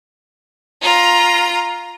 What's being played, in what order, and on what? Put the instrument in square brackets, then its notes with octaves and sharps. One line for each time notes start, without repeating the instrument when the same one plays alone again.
[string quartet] F4 A#5